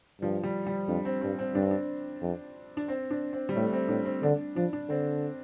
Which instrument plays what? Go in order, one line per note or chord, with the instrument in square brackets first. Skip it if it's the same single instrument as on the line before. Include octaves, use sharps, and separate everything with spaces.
[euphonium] G2 [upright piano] F3
[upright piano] G3
G3
[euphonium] F2 [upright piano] D4
[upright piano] C4
[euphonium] G2 [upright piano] C4
[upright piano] C4
[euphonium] G2 [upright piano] D4
[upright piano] C4
D4
[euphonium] F2
[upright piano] D4
C4
D4
C4
G3
[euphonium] A2 [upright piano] A3
[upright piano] C4
[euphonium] A2 [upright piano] D4
[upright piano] C4
[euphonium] D3 [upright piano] D4
[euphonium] F3 [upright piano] D4
[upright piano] D4
[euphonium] D3 [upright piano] C4